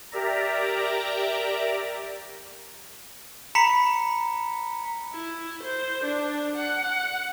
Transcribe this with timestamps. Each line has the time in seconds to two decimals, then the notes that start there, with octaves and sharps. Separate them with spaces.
0.11 G4 A#4 D5 E5 A#5
3.55 A#5 B5 B6 C#7
5.12 E4
5.63 C5
6.04 D4
6.56 F#5